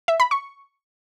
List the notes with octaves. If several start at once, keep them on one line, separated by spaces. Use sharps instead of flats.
E5
B5
C#6